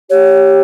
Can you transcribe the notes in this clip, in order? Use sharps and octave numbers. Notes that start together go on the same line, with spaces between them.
G4 C#5